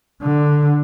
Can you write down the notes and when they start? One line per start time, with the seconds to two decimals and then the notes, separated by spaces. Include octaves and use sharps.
0.22 D3